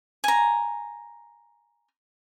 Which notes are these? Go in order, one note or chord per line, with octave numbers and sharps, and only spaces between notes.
G#5 A#5